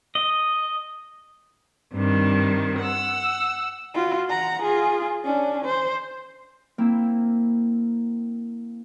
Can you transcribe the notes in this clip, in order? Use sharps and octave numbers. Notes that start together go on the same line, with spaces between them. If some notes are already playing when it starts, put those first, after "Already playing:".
D#5
G2 C3 D#3
F#5 E6
F4 F#4
F#5 A#5
F4 G#4
C#4 D4
C5
A#3 C4 E4